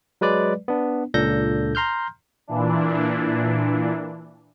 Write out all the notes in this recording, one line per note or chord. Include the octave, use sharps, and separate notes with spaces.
F#3 G#3 B4 D5
B3 D4
C#2 A#2 D4 A4 G6 A#6
A#5 C6 F6 G6
A#2 E3 D4